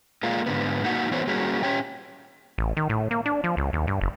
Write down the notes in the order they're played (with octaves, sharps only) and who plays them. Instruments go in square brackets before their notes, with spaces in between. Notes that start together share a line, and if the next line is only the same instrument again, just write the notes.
[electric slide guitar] G#3 A#3 F4
G#2 D3 B3
A#3 D#4 F#4 F#5
E3 B3 F#4 C5 C#5
G3 A#3 C#4 F#4 G#4
C#4 G4 C#5 G5
[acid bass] A1
D#3
A2
A#3
D4
F3
C#2
D#2
G2
F#1